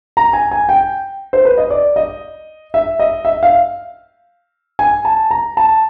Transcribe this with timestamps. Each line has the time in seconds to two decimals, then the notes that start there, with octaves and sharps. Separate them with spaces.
0.17 A#5
0.33 G#5
0.51 G#5
0.69 G5
1.33 C5
1.45 B4
1.58 D#5
1.70 D5
1.96 D#5
2.74 E5
3.00 D#5
3.25 E5
3.43 F5
4.79 G#5
5.05 A5
5.31 A#5
5.57 A5